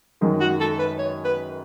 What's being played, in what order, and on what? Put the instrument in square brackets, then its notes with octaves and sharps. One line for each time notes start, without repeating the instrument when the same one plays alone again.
[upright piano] F#2 D#3 G#3 D#4
[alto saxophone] F#4
A4
B4
C#5
B4